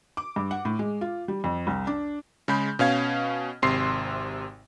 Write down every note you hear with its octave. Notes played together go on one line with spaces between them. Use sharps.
D6
G2
F#5
A2
G#3
F4
G3
F2
C2
D4
C#3 G#3 B5 G6
B2 C#4 F5 G#6
G#1 C3 C6 C7